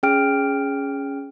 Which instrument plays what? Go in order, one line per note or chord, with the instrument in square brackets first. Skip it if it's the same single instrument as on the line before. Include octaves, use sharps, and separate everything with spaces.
[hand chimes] C#4 G#4 G5 F6 D7